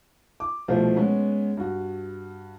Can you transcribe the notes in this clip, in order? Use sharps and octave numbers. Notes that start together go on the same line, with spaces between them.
D6
C2 B2 F3 A3 C5
G#3 B3 C#4
G2 F#4